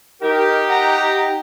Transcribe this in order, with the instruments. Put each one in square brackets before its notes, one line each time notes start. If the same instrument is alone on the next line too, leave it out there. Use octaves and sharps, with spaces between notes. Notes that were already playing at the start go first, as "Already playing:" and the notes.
[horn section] D#4 G4 [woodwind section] A#4
[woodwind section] F#5 A#5